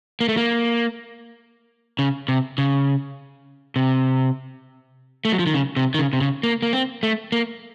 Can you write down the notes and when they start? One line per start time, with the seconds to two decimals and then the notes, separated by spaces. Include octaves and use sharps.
0.21 A#3
0.28 A3
0.37 A#3
1.99 C#3
2.28 C3
2.58 C#3
3.76 C3
5.25 A3
5.32 F#3
5.39 F3
5.46 D#3
5.54 C#3
5.77 C3
5.94 D#3
5.99 C#3
6.13 C3
6.21 C#3
6.43 A#3
6.62 A#3
6.73 C4
7.03 A3
7.32 A#3